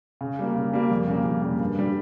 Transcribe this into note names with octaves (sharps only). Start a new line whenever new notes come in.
C#3
G3 A#3
C#3
G3 A#3
F2
C#3 G3 A#3
F2
C#3 G3 A#3
G2
D3 G3